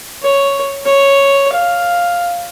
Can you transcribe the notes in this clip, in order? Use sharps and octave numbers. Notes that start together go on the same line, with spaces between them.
C#5
C#5
F5